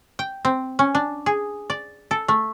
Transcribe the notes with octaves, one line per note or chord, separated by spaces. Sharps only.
G5
C4
C#4
D4
G#4
D5
A4
A3